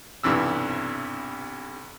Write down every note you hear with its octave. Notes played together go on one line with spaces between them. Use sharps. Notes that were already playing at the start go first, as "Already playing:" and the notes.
B1 G2 C3 E3 E6